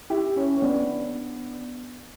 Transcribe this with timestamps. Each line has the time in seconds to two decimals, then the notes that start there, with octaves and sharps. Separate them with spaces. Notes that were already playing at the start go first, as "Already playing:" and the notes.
0.10 E4 G4
0.36 C#4 E4
0.56 C#4
0.62 B3 D4